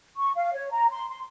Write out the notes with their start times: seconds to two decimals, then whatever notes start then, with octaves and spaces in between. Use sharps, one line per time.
0.18 C#6
0.36 F5
0.54 C#5
0.72 A#5
0.91 C6
1.09 C6